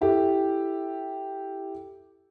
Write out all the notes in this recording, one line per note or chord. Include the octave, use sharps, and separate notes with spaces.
E4 G4 A4